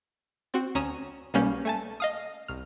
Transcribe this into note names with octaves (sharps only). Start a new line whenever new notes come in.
C4 F#4
D2 C#4 A#5 D#6 E7
B1 B2 G3 A#3 C#4 G6
A3 G#5 A5
D#5 F5 D#6
C2 F6